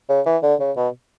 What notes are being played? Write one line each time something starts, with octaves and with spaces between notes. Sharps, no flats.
C#3
E3
D3
C#3
B2